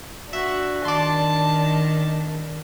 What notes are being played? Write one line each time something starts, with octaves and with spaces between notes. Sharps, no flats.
D4 F#4 E5
D#3 D5 A5 C6